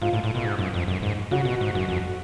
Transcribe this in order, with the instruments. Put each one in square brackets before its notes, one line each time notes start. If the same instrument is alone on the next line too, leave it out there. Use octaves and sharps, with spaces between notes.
[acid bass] G#2 [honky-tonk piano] F4
[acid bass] A2
A2
B2
G#2
F#2
F2
F#2
G#2
[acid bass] C#3 [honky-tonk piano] F#4
[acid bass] B2
G#2
F#2
F2